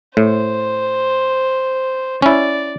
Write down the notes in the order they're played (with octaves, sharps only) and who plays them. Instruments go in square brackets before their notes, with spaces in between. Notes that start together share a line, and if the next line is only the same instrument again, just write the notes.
[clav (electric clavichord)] A2 [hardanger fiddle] C5
[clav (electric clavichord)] C#4 E4 [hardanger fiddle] D5